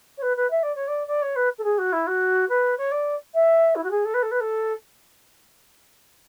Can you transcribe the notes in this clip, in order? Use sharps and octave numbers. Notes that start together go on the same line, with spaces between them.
C#5
B4
B4
E5
D5
C#5
D5
D5
C#5
B4
A4
G#4
F#4
E4
F#4
B4
C#5
D5
E5
E4
F#4
G#4
A4
B4
A4
B4
A4